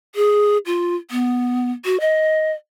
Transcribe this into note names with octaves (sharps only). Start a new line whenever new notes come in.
G#4
F4
B3
F#4
D#5